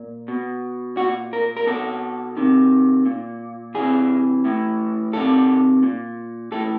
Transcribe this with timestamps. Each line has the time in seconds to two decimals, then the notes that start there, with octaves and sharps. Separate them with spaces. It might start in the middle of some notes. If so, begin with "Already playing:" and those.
Already playing: A#2
0.28 B2
0.97 A#2 F#4
1.33 A#4
1.57 A#4
1.67 B2 A4
2.37 C3 D#3
3.06 A#2
3.75 C3 E3 G#4
4.45 A2 E3
5.13 C3 D#3 A4
5.83 A#2
6.52 A2 E3 A4